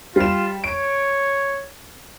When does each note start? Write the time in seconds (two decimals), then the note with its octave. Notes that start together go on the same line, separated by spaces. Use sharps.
0.16 G3 F4 E7
0.64 C#5 D7